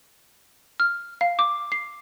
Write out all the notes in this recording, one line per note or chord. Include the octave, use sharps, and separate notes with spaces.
F6
F5
D6
C7